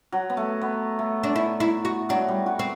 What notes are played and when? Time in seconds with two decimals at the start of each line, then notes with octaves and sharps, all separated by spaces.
0.12 F#3
0.30 B3
0.37 A3
0.61 B3
0.99 A3
1.23 D4
1.36 E4
1.60 E4
1.85 F#4
2.09 F#3 D4
2.28 G3
2.46 F#4
2.59 C4